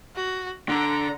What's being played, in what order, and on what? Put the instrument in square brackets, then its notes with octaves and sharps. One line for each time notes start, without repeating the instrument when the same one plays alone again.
[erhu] F#4
[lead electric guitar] D3 [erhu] A#5